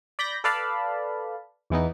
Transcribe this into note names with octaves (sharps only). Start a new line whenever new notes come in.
D5 B5 G6 A#6
A4 B4 D5 F5 A5 B5
E2 E3 B3 D#4